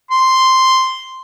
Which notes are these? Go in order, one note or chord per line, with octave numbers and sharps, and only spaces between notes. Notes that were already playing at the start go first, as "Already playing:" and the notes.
C6